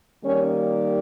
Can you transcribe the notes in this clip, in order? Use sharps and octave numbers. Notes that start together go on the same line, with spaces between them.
D#3 G3 A#3 C#4